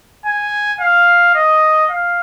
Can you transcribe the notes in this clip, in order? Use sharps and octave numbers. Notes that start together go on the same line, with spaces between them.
G#5
F5
D#5
F5